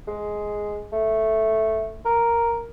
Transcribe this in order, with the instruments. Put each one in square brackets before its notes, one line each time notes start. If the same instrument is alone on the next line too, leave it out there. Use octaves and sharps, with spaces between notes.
[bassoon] G#3
A3
A#4